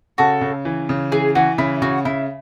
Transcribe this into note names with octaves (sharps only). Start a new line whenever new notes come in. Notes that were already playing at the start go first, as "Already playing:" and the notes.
C#3 F#4 A4
C#3
E3
C#3
E3 G#4
E3 F#4
C#3 E4
C#3 F#4
C#3 E4